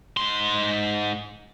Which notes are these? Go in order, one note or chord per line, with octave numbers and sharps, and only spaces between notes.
G#2 C6